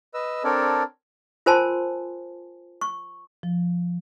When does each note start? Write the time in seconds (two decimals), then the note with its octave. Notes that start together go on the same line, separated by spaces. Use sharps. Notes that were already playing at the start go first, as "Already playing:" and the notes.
0.14 B4 D#5 E6
0.44 C4 D4 A4 A#4 C#5 D5
1.46 F4 A#4 C5 G#5 A5 C6
2.81 C#6
3.43 F3